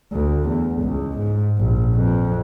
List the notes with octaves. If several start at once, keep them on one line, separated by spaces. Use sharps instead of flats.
D2
E2
C#2
G#2
A#1
F2